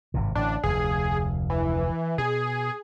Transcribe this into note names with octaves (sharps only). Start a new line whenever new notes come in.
G#1 G2 C3
A1 A2 D3 D4
F1 D2 G#4
E3
B2 G#4